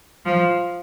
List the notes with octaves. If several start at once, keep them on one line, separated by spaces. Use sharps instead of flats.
F3